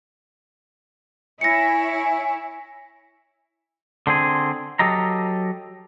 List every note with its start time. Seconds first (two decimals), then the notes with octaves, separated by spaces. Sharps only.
1.41 E4 C#5 G#5 A#6 C#7
4.07 D3 C4 G#4
4.79 F#3 G4 A4 D#5 A#5